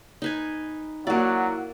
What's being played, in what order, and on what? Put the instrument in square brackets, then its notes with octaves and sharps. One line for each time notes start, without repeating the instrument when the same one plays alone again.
[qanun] D#4 B4 G#5
[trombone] F#3 [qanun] A#3 D5 [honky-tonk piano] E4 F#4 F#5